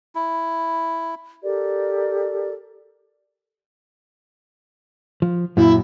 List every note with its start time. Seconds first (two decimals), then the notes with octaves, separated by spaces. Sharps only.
0.15 E4
1.43 G4 A4 A#4 D5
5.22 F3
5.57 F#2 A#2 E4